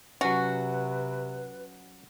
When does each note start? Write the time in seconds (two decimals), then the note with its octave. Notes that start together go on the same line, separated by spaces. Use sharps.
0.21 C3 F#3 C#4 F#4 B4